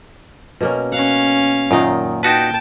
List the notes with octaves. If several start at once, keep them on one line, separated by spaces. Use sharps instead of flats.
B2 A#3 C#4
C#4 F5 F#5
F#2 A#2 D#3 D#5
D#4 F#4 B4 G5 A5